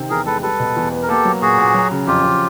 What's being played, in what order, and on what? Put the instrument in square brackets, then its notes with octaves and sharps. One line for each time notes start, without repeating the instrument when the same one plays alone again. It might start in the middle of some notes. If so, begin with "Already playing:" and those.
Already playing: [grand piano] C3 D#3 C4
[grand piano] E2 [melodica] G#4 A#4
[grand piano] G#3 [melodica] A4 B4
[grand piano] G3 [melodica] A4 B4
[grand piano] B2
E2
B3
[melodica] A#4
[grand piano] A#3 [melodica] G4 A4
[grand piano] F#3
[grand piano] A#2 [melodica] F#4 G#4
[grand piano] A#2
F#3
C#3
[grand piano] F2 [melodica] F4 G4
[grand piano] F2